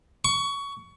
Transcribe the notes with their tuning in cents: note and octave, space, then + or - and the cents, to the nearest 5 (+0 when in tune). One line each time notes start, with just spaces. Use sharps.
C#6 +20